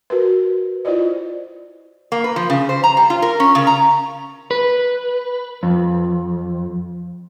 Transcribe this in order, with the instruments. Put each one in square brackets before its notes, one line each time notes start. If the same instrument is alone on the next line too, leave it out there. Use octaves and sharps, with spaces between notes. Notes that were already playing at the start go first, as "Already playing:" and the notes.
[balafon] F#4 A#4 B4
E4 F4 C5 D5 D#5
[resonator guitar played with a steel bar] A#3
B4
F3
C#3
C5
A#5
G3
F4
A#4
C#4
C#3
A#5
[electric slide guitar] B4
F2